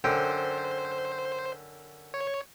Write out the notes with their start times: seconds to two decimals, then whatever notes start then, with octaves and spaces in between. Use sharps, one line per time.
0.04 F#2 D3 C5 G5
2.14 C#5